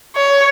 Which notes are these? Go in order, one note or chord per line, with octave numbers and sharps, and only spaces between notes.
C#5